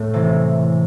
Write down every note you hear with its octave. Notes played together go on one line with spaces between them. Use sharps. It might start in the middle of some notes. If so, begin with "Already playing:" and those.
Already playing: A2 A3
C3 E3